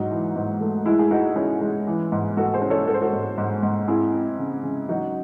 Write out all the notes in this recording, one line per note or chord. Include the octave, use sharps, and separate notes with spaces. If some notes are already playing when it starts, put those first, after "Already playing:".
Already playing: G#2 F#3 D#4 F#4
E3
G#2
A3
G#3 E4
G#4
G#3 D#4 F#4
C#4 E4 G#4
G#3
E3
G#2
G#2 F#4 A4
G#4 C5
C#4
A4 C#5
G#3 A4
C5
F#4 A4
G#2
G#2
G#2
C4 E4 G#4
C4
C#3
C#3
F#3 D#4 F#4